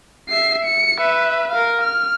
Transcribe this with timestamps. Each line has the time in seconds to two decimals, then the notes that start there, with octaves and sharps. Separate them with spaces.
0.29 E5 C7
0.65 C#7
1.00 B4 E5
1.51 A#4 F5
1.82 F6